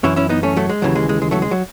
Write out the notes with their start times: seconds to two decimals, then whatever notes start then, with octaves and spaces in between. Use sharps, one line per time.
0.04 F#2 E3 C#4 E4
0.16 C#4 E4
0.29 B3 D#4
0.43 A3 C#4
0.56 F#3 A3
0.69 G#3
0.82 D#2 C#3 E3 F#3
0.95 G#3
1.09 G#3
1.22 G#3
1.31 F#3 A3
1.42 G#3
1.51 F#3